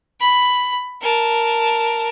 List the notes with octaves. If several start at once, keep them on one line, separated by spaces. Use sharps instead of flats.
B5
A#4 A5